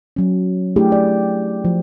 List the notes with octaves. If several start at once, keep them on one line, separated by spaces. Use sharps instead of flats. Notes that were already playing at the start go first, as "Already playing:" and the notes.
F#3 C#4
A3 D4 E4 G4 G#4
D5
F3